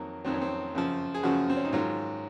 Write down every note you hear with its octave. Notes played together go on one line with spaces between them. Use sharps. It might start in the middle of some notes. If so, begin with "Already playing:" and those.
Already playing: F2 D#3 F#3 A#3
F2 D#3 F#3 C4
C#4
C4
F#2 C#3 F3
G#4
F#2 C#3 F3 F#4
C4
C#4
D#4
G#2 D#3 F#3 F4